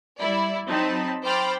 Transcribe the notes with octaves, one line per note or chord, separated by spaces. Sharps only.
G3 E4 D5
F#3 C4 D#4 A5 B5
C5 G5 B5 D6 F6 A6